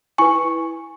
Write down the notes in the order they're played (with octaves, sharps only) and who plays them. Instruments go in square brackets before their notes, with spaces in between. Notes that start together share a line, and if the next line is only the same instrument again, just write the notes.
[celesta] E4 B4 G#5 C#6